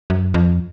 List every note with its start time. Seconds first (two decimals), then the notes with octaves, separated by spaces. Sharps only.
0.10 F#2
0.34 F2